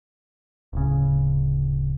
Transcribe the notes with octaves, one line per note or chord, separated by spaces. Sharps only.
D1 C#3